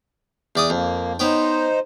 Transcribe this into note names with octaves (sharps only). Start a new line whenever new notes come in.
E2 D5 D#6
F2 A#3
B3 D#4 C5 C#5 G5